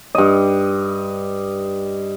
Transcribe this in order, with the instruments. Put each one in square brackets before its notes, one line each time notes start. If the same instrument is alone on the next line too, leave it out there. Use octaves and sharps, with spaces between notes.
[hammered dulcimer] G2 D#5